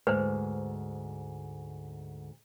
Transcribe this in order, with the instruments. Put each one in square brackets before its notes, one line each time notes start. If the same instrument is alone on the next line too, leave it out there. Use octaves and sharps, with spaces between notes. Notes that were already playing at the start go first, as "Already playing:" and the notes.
[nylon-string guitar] D2 G#2 [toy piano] B4 C5